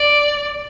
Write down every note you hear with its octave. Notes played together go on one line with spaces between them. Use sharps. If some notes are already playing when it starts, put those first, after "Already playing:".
Already playing: D5